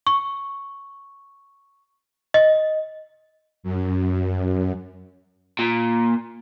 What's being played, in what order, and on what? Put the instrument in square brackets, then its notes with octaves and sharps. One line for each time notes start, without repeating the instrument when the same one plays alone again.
[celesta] C#6
D#5
[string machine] F#2
[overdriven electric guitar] A#2